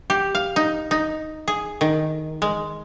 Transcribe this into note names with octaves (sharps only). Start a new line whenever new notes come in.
G4
F5
D#4
D#4
G#4
D#3
G#3